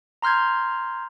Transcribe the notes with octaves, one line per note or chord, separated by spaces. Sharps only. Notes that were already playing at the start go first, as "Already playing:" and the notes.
A#5 C6 F6 G6 G#6